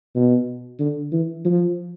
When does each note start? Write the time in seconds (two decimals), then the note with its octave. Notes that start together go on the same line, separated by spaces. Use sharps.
0.15 B2
0.80 D3
1.12 E3
1.45 F3